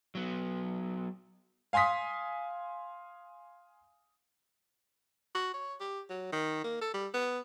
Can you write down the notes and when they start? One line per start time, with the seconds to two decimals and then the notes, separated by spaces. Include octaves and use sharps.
0.15 F#3 B3
1.73 F5 G#5 C6 D#6 B6
5.35 F#4
5.54 C#5
5.80 G4
6.10 F#3
6.32 D#3
6.64 A#3
6.81 A4
6.94 G3
7.14 B3